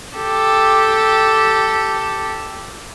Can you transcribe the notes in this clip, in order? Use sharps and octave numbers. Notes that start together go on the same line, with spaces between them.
G4 A4